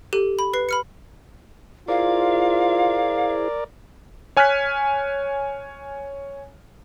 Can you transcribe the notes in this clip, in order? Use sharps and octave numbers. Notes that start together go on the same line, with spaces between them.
G4 A4 D#7
B5
B4 C7
B5 F6 C#7
E4 F4 G#4 A#4 C5 D5 F5
C#5 G#5 F6 F#6 G#6 B6